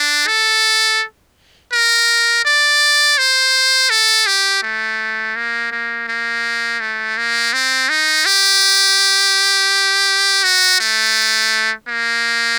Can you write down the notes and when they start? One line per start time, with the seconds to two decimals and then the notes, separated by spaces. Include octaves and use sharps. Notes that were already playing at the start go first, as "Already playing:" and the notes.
Already playing: D4
0.27 A4
1.73 A#4
2.45 D5
3.18 C5
3.90 A4
4.27 G4
4.63 A3
5.36 A#3
5.72 A#3
6.08 A#3
6.81 A3
7.17 A#3
7.53 C4
7.89 D#4
8.26 G4
10.44 F#4
10.80 A3
11.89 A#3